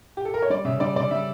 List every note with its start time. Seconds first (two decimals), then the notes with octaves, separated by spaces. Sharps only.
0.17 G4
0.25 A4
0.34 A#4
0.42 C#5
0.50 G3 D5
0.65 C#3 E5
0.80 G3 D5
0.96 C#3 D5
1.11 G3 E5